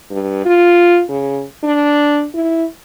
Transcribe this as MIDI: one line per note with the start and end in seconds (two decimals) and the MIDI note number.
0.10 0.41 43
0.45 1.02 65
1.09 1.43 49
1.63 2.26 62
2.34 2.65 64